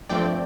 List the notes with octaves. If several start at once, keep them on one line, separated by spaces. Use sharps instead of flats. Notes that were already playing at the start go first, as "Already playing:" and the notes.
G2 F3 A3 C4 D5 G5